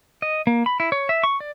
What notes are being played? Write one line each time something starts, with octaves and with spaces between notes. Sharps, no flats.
D#5
A#3
B5
E4
C#5
E5
C#6
D5